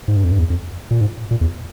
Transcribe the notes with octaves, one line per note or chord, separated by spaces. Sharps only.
G#2
G2
F2
G2
E2
F2
A#2
G#2
A#2
E2